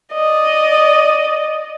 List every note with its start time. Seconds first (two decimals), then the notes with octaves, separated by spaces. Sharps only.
0.14 D5 D#5